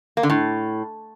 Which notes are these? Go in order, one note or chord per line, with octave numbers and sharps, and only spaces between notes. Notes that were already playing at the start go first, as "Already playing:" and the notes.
A#3
D3
A2